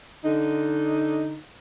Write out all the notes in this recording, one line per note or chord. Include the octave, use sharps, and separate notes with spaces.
D3 D#4